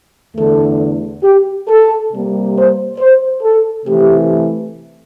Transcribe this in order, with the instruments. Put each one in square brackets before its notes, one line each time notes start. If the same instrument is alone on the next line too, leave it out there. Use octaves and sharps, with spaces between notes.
[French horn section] E2 D3 A3 A4
G4
A4
C3 G3 A#3
C5
C5
A4
C3 E3 A3 G4